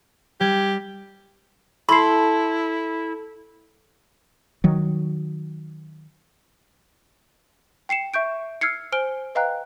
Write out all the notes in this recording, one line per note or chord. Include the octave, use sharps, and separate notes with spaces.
G3 G4 G#6
E4 A4 B5 C6 C7
D#3 F#3
G5 C7 C#7 E7
E5 C#6 G6 D7
E6 F6 G#6 C7 C#7
C5 G#5 F6 D7 G7
B4 D#5 F5 G5 A#5 F#6